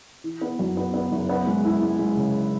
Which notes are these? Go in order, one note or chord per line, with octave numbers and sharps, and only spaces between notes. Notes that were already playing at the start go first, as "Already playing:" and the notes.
E3
B3
F#2
B3
B3
F#1
B3
G#3
E4
G#3
G#3
C#3